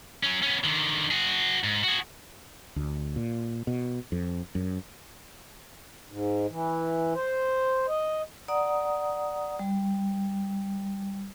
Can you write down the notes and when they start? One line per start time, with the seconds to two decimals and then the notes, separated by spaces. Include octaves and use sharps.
0.23 F#3 C#4
0.43 B3 C#4
0.64 D3 D#3
1.11 F#4 G#4
1.64 G#2
1.84 F#4 G#4
2.76 D2
3.16 A#2
3.67 B2
4.12 F2
4.55 F#2
6.09 G#2
6.50 E3
7.15 C5
7.88 D#5
8.48 D5 F#5 A#5 D#6
9.59 G3